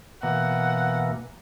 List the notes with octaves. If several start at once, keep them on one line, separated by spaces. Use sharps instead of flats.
B2 E3 A#3 F#5